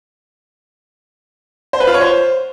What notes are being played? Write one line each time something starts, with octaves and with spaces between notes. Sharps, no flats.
C5
B4
F4
C#5
C5